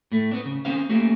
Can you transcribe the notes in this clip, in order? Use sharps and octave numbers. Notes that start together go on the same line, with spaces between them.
A2 A3
B3 C4 D4
C#3
C4 C#4 C5 F5
A3 A#3 C#4 F#4 G4